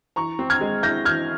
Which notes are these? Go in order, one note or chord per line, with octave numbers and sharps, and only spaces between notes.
E3 A#5 C#6
C4
F6 G#6
G#3
E4 G6 A#6
E3 F6 G#6